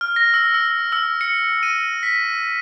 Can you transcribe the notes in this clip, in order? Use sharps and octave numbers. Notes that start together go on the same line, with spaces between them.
F6
A#6
E6
E6
E6
C#7
D#7
B6